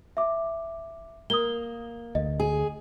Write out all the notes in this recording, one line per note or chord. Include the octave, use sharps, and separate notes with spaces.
E5 D6
A#3 D#6 G7
D2 D#5
G#4